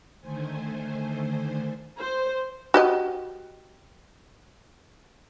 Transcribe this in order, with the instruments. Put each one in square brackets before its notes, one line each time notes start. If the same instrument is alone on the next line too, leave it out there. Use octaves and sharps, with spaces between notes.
[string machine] D3 D#3 A3 C5 G#5
[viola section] C5
[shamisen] F#4 G4 D#5